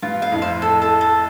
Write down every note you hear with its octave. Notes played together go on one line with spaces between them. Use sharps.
G2 F4
F5
F2 A2
C5
A4
A4
A4